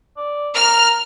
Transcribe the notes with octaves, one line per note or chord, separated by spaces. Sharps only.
D5
A#4 F6